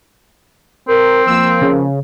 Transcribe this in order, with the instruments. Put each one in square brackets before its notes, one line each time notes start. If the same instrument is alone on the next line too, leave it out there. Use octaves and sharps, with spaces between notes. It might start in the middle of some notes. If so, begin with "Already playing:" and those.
[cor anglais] C4 [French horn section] A#4
[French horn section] F3 A#3 [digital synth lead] E6
[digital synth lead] C#3